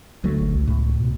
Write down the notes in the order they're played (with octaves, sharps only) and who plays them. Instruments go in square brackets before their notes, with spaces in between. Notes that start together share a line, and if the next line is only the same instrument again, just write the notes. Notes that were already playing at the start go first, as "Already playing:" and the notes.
[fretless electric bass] D2 F#3 A3
[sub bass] G#1
C#2
[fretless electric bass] A2
[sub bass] B2